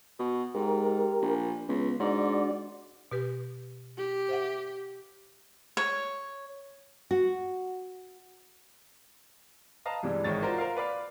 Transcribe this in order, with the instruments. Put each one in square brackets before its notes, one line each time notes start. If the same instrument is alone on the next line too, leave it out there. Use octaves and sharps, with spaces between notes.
[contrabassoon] B2
[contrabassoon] G#2 [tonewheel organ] G4 A#4
[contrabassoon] A#1
[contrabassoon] C#2 [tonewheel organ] B3
[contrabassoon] G#2 [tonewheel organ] D4 F#4 D5
[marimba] B2 G4 B4
[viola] G4
[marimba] C5 E5 F#5
[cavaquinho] C#5
[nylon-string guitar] F#4
[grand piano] B4 D#5 F5 A5 A#5
G2 C3 E3 G3 G#3
G#1 D#3 E3 G#3 C#5 A6
F4 F#4 A#4 C5 D5
A#4 C5 F5
B4 D5 F5